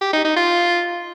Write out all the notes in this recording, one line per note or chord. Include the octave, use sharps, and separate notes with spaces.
G4
D#4
D#4
F4